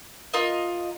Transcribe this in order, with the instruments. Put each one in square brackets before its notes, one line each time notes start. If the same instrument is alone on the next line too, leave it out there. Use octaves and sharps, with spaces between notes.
[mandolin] F4 A#4 D#5